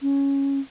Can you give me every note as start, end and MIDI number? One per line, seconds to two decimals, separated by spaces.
0.01 0.59 61